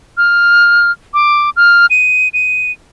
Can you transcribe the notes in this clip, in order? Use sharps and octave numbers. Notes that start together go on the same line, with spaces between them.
F6
D6
F6
D#7
D#7